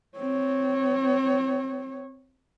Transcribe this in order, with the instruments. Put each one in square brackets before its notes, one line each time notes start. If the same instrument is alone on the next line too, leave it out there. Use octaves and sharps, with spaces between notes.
[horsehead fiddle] C4 C#5